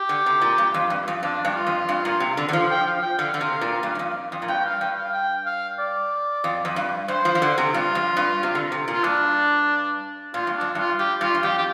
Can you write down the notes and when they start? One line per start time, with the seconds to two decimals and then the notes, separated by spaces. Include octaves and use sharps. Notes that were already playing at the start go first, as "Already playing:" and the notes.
Already playing: G4
0.09 D3
0.26 C3
0.41 A#2
0.58 G2
0.74 F2
0.90 G2
1.08 F2
1.23 F2 D4
1.45 G2
1.55 F4
1.67 F2
1.89 G2
2.05 A#2
2.20 C3
2.37 D3
2.49 D3
2.53 F3 F5
2.70 G5
2.87 F5
3.02 G5
3.19 D3 F5
3.34 D3
3.41 C3
3.61 A#2
3.83 G2
3.95 G2
3.99 F2
4.32 F2
4.42 A#2
4.48 G2 G5
4.65 F5
4.81 G2 G5
4.98 F5
5.13 G5
5.46 F5
5.79 D5
6.44 F2
6.65 F2
6.76 G2
7.08 G2 C5
7.25 F3
7.35 F3
7.42 D3
7.58 C3
7.73 G2 F4
7.95 F2
8.17 G2
8.43 C3
8.55 D3
8.72 C3
8.88 A#2 F4
9.04 G2 D4
10.34 A#2 F4
10.47 G2
10.55 D4
10.61 F2
10.75 G2 F4
10.99 G2 G4
11.21 G2 F4
11.35 G2
11.43 F2 G4
11.58 G4